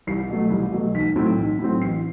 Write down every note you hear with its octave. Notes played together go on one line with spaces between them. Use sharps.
C2 C7
B2 F#3 A3
C2
B2 F#3 A3
B1 B6
A2 F#3 C4
B1
A2 F#3 C4
A1 C7